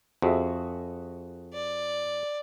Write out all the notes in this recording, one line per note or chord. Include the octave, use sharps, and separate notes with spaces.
F2 F#4 G#4 E5
D5